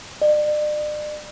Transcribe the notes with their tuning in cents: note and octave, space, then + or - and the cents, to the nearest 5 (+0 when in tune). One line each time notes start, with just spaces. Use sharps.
D5 +40